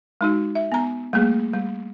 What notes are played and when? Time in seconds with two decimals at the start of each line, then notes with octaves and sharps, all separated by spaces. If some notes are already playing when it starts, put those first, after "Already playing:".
0.21 G#3 D#4 F#4
0.55 E5
0.72 B3 A#5
1.13 G3 A3 A#3 G#4
1.53 G3